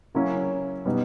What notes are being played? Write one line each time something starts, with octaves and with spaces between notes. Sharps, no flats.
C#3 F#3 A#3 C#4 E4
B2 G3 B3 D#4